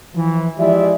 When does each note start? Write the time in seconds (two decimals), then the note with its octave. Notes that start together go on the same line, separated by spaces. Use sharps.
0.14 E3 F3
0.58 F3 G#3 E4 G4 D5 E5